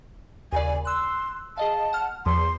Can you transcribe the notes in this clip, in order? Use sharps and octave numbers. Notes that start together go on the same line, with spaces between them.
D#2 C#3 D5 G#5
C6 E6 F#6
G#4 D#5 F5 A5
F#5 F6
E2 F3 C6